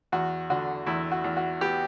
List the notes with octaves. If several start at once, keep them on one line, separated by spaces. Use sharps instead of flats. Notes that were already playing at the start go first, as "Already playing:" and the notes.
E2 F#4
D3 F#4
E2 E4
F#4
E2
F#4
B3 G4